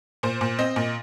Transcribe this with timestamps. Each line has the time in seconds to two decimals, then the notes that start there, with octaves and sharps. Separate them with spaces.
0.23 A#2 C5
0.41 A#2
0.59 C4 D#5
0.76 A#2